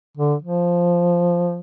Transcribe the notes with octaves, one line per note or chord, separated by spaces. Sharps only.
D3
F3